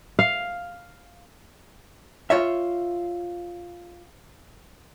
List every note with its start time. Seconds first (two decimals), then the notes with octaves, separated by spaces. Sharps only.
0.19 F5
2.30 F4 C#5 E5